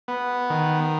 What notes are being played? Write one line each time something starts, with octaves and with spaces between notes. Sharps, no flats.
B3
D#3